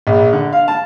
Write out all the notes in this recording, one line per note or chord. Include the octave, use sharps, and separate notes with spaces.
A#1
D3
F5
A5